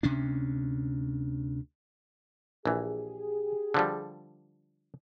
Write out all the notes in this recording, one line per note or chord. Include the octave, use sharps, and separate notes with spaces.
D2 C3 C#4 D4
A#1 E3 G4 G#4
D3 F3 G3